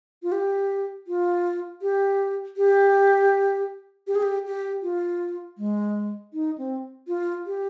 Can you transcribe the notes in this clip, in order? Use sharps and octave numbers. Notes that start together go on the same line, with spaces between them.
F4
G4
F4
G4
G4
G4
G#4
G4
G4
F4
G#3
D#4
C4
F4
G4